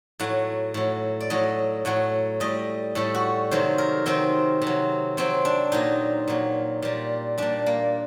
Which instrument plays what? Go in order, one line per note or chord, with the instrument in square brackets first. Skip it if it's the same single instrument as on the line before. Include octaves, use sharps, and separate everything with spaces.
[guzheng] A2 F#3 F#5
A2 F#3
D5
A2 F#3 D#5
A2 F#3 F#5
A2 G3 D#5
A2 G3 A4
F#4
C3 D#3 F#3 C5
A#4
C3 D#3 F#3 C4
C3
F#3
C3 F#3 C4
D4
A#2 F#3 D#4
A#2 F#3
A#2 G3
A#2 G3 D4
A#3